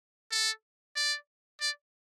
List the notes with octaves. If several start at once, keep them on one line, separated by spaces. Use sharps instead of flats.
A4
D5
D5